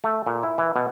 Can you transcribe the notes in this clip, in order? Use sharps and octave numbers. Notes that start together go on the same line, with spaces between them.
A3
A#2
E4
E3
B2